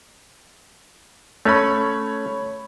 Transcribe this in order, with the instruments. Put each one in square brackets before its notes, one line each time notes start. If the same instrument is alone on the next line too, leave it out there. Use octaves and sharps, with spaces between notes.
[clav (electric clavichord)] A3 C#4 [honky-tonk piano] C#5 B5